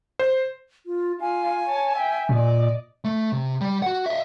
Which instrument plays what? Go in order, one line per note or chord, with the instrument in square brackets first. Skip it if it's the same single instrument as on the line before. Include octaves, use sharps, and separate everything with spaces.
[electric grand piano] C5
[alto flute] F4
[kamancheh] F4 [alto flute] G#5
[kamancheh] C#5 A5
E5 G5
[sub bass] A#2 [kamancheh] D5 D#5
[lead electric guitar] A3
C3
G3
F#4 F#5
D#5 E5